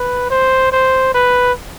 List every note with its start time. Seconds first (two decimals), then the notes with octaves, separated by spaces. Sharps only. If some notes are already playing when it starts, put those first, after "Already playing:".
Already playing: B4
0.30 C5
0.72 C5
1.14 B4